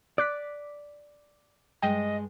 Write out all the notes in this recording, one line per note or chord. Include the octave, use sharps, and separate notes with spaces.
D5 D6 F#6 B6
G2 G#3 D#5 G5